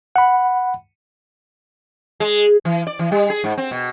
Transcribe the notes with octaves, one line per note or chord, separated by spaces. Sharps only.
F#5 B5
G#3
E3
D5
E3
G3
G#4
G#2
C4
B2